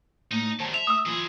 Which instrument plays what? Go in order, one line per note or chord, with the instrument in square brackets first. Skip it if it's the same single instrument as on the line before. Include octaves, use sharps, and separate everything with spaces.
[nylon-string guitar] A2 A3 [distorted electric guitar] D#4
[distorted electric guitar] B2 D#3 [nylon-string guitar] G3 C5 A5
[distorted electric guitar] E5 [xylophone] F7
[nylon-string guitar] A3 [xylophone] D#6 E6
[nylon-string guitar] E3 F4 [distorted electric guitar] F#3 G#4